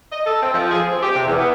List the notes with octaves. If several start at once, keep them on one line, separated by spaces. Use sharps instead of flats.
D#5
A4
C4
F3
G#4
C4
G4
C3
E2
B3